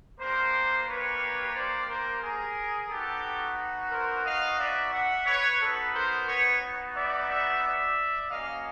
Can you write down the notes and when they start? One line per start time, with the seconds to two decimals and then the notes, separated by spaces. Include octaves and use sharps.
0.20 A#3 D4 G4 A#4 C5
0.87 B4 C#5
1.55 C5 D5
1.89 A#4 C5
2.23 G#4 A#4
2.90 B3 D#4 F#4 G4 A4
3.92 A#4 C5
4.25 D#5 F5
4.59 D5 E5
4.93 E5 F#5
5.27 B4 C#5
5.61 B3 D#4 F#4 A4 B4
5.94 A#4 C5
6.28 B4 C#5
6.95 D5 E5
7.29 D5 E5
7.63 D5 E5
8.30 A#3 C#4 F#4 D#5 F5